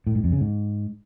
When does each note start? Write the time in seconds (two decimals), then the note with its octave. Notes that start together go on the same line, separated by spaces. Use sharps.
0.07 A2
0.15 G#2
0.24 F2
0.32 C#3
0.41 G#2